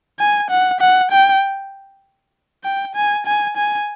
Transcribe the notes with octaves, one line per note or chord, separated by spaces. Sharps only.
G#5
F#5
F#5
G5
G5
G#5
G#5
G#5